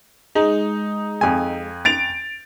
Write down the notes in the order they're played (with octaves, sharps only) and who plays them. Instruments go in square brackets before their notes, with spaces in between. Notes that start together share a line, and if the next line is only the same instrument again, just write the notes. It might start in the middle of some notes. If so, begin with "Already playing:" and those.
[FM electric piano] G#3 [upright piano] D#4
[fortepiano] F2 G#5
[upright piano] A6 D7 F7